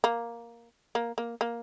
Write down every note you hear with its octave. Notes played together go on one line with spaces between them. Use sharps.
A#3
A#3
A#3
A#3